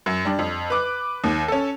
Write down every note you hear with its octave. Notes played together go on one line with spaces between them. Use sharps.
F#2
G3 D4
F2
B4 D6 F#6
D#2
C#4 A4